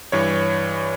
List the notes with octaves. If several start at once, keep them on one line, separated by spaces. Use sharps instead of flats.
G2 E3 C#5